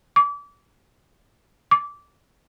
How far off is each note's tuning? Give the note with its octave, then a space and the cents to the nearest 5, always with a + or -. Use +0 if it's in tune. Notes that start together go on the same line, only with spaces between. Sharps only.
D6 -30
D6 -15